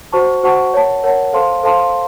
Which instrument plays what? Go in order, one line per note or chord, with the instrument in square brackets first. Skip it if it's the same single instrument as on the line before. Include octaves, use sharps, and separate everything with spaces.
[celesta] F#4 C5 F#5 A5 C#6
F#4 C5 F#5 A5 C#6
A#4 C#5 F#5 A5
A#4 C#5 F#5 A5
A4 C5 F5 A5 C6
A4 C5 F5 A5 C6